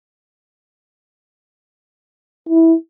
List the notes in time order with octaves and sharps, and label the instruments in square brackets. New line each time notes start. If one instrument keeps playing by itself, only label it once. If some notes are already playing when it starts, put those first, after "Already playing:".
[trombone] E4